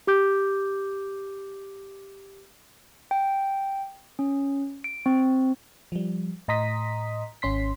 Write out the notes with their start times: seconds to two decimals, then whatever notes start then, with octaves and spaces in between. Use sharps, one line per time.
0.07 G4 D6 G6
3.11 G5
4.19 C#4
4.84 D7
5.06 C4
5.92 F3 G3
6.48 A2 D#5 A#5 C6 D#6 B6
7.42 G#1 C#4 C6 B6